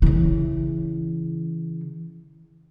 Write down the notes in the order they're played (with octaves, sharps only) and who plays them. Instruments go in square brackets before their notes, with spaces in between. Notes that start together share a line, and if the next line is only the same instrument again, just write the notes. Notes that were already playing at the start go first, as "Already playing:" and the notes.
[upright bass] C#3 E3